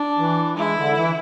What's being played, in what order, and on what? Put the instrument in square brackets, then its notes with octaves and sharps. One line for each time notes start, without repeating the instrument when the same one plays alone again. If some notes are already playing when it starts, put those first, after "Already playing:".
Already playing: [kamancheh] D4
[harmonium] E3
[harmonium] G#3 [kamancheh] E4
[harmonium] D3
E3